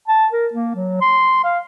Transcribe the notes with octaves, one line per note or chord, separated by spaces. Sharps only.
A5
A#4
A#3
F#3
C6
F5